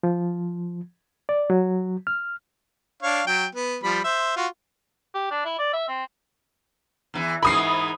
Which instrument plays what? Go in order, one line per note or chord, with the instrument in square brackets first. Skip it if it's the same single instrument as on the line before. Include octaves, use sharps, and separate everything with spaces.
[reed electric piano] F3
D5
F#3
F6
[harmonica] D4 C#5 F5
F#3 G5
B3
F3 G3 B5
C5 E5
F4 F#4
[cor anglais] G4
D4
E4
D5
E5
C4
[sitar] E2 E3
[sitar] G#2 E3 A#4 [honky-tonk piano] B5 D#6 C7